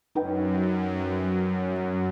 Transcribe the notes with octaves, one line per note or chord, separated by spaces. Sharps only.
F#2 D#4 B4 G5